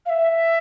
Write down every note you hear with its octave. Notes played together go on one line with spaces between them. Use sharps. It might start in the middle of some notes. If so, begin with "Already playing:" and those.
F5
E5